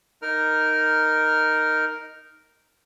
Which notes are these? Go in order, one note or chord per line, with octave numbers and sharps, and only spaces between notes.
D#4 A#4 F6